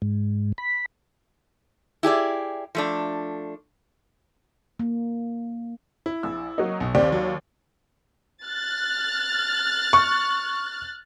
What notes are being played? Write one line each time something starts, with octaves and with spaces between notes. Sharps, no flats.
G#2
B5
E4 G4 G#4 D5
F3 A3 D4
A#3
E4
A#1 E6
F#3 A#3 D#4
B1
D#2 C4 G4 D5
F#3
F6 F#6 A6
C#6